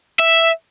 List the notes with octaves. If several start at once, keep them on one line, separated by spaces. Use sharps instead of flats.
E5